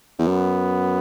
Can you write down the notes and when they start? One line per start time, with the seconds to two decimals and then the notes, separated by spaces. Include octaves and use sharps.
0.19 E2
0.27 F#2 B3